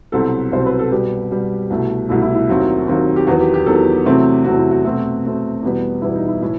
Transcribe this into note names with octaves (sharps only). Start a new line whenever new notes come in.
C2 B2 F#3 C4 A4
C2 B2 F#3 C4 C5
B4
A4
B2 G3 B3 G4
B2 G3 B3
C2 B2 A3
C2 B2 A3 E4
E4
E4
D#2 D#3 F#3 C4
D#2 D#3 F#3 C4
G4
E2 D#3 F#3 B3 F#4
G4
G4
E2 D#3 F#3 B3 A4
E2 C3 F#3 A3 C4
E2 C3 F#3 A3 C4 F#4
E4
F#4
B2 A3 C4 F#4
B2 A3 C4
E2 B2 G3 B3
E2 B2 G3 B3 E4
D#4
E4
A2 E3 E4